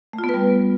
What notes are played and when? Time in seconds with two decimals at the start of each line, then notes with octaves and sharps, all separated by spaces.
0.13 A3
0.19 F4
0.24 B3
0.29 B4
0.34 G3